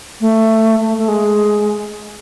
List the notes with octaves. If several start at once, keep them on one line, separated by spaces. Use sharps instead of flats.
A3
A3
A3
G#3